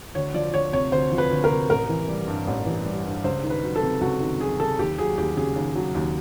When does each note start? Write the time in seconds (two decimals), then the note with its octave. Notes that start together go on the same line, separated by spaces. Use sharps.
0.15 D2 C#5
0.34 F3 D5
0.54 D2 C#5
0.73 C3 C#5
0.92 D2 C5
1.12 F3
1.18 B4
1.31 D2
1.44 A#4
1.50 C3
1.69 A1 A#4
1.89 E3
2.08 G3
2.27 G2
2.47 A1
2.66 E3
2.86 G3
3.05 G2
3.24 C#2 C5
3.43 D#3
3.50 B4
3.63 F#3
3.76 A4
3.83 C3
4.01 C#2 F#4
4.21 D#3
4.40 F#3 G#4
4.59 C3 A4
4.79 D#2 G4
4.98 F#3 G#4
5.18 D#2 G4
5.37 C#3 G#4
5.56 D#2
5.76 F#3
5.95 D#2